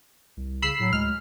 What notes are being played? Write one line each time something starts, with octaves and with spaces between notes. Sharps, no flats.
C2
C#3 B5 E6 C7
A2 F#3
D2 G#3 F6